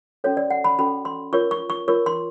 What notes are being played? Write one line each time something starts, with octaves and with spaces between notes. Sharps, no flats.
C#4 F#4 A4 C#5
D5
F#5
B5
C#4 F#4 A4 B5
C6
F4 A#4 C#5 C#6
C#6
C#6
F4 A#4 C#5 C#6
C6